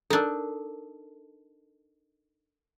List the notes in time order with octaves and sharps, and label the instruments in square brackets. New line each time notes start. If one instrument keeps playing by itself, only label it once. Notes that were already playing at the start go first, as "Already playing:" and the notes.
[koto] D4 D#4 [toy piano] A4 A#4